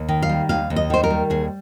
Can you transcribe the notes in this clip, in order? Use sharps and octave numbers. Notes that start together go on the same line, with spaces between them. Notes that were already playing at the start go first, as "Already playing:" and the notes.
Already playing: D#2
D#3
F5
G3
D#2 F5
D#2
D#5
D#3 C5
A#4
G3
D#2 G#4